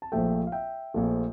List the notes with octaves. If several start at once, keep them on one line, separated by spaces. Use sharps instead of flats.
A5
A#1 A#2 F3 A3 E5 G5
F5
E5 G5
A#1 A#2 F3 A3